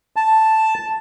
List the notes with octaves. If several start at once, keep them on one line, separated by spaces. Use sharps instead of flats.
A5